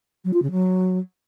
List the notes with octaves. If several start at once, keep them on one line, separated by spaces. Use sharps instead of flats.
F#3
F4
C#3
F#3